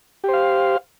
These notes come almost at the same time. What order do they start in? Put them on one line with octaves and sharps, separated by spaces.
G4 C5 F5